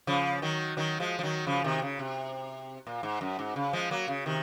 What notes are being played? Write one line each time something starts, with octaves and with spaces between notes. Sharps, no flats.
C#3 F3
D#3 F#3
D#3 F#3
F3 G#3
F3
D#3 F#3
C#3 F3
C3 D#3
C#3
C3
A#2
G#2
F#2
G#2
C#3
F3 G#3
F#3 A#3
C#3
C3 D#3